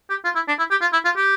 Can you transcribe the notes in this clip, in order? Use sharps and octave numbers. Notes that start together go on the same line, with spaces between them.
G4
F4
E4
D4
E4
G4
F4
E4
F4
G4